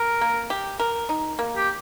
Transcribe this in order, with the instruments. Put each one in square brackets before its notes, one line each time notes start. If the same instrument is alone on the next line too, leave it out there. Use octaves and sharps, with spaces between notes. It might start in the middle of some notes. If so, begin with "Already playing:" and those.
Already playing: [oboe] A#4
[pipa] A#3
G4
A#4
D#4
A#3
[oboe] G4